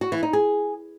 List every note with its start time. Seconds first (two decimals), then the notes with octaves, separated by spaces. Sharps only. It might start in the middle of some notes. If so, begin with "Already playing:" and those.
0.01 F#4
0.12 E3
0.23 D#4
0.33 G#4